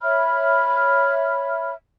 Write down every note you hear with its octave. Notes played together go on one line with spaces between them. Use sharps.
C#5 E5 B5 F6